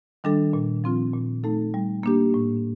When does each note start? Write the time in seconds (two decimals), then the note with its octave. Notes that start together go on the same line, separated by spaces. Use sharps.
0.24 D#3 G3 D4 A4
0.53 A#2
0.84 F3 C4 F4
1.14 A#2
1.44 A3 D#4 A4
1.74 G3
2.03 A#3 D4 G4
2.34 A2